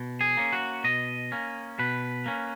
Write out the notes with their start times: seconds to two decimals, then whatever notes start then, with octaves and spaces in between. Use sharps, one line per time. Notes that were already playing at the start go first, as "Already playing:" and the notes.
Already playing: B2
0.21 G#4
0.37 A#3 C#4
0.53 F#4
0.84 B2 D#5
1.32 A#3 C#4
1.79 B2 B4
2.26 A#3 C#4